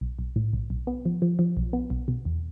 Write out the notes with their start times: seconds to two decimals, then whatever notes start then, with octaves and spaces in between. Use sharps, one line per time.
0.01 B1
0.19 B1
0.36 A2
0.53 B1
0.70 B1
0.87 B3
1.05 F3
1.22 F3
1.39 F3
1.57 B1
1.73 B3
1.90 B1
2.08 B2
2.25 E2